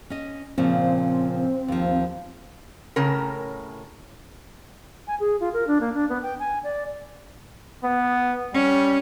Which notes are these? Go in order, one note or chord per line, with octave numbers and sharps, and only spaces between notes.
C#4 D#5
A#2 C#3 F3 C4
D#2 F3
A2 C#3 C#4 A#4
G#5
G#4
F4
A#4
D4
A#3
D4
B3
G5
G#5
D5
B3
G3 C#4